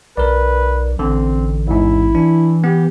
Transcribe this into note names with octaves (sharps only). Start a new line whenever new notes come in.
B1 A#4 B4 D5
A1 D3 C4
E2 G#2 E4
E3 D4
B3 G4